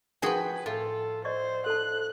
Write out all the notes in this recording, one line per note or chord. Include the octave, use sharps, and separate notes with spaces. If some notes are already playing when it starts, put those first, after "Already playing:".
F3 D#4 F#4 G#4 A#4 B4 G5 G#5
A2 F4 A4
C5 D5 D#5 C#6
A4 A5 F#6